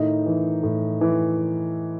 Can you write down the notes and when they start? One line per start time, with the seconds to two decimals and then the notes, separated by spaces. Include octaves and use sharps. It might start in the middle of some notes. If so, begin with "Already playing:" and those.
Already playing: A2 D#3 D#4
0.26 E3
0.63 A2
1.01 E3